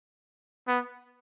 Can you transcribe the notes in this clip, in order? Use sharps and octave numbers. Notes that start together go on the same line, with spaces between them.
B3